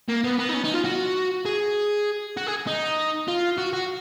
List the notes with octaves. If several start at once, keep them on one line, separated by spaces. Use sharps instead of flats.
A#3
B3
B3
D#4
C#4
D#4
F4
F#4
G#4
F#4
G#4
D#4
F4
F#4
F#4